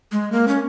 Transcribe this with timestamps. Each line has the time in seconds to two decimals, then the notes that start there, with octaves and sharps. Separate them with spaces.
0.12 G#3
0.32 A#3
0.48 C#4